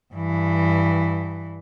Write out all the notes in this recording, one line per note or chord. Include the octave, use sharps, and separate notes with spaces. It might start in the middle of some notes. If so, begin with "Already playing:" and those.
G2 E3